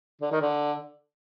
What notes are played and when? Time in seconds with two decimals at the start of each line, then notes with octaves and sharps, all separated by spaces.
0.21 D3
0.32 D#3
0.42 D3